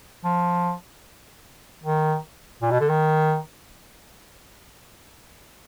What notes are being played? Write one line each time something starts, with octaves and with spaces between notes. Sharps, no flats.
F3
D#3
A#2
B2
D3
D#3